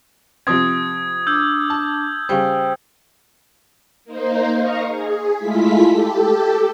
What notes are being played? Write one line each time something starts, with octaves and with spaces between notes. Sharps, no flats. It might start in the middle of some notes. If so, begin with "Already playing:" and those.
C3 F3 C4 D#6 G#6
D4 D6 E6 G6
A5
C#3 G3 C5 G5
A#3 D#4 C5
D#5 F5 A#5 C#6
G#4
G#3 A3 E4 F4 B6
G4 A4